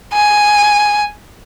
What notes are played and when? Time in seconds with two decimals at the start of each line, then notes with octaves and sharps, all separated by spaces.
0.14 G#5